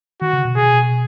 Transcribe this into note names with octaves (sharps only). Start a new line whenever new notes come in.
D#3 F#4
C#3
B2
G#4